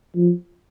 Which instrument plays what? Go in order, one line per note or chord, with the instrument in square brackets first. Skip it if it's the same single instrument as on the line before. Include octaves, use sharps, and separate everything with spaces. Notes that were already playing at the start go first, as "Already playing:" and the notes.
[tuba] F3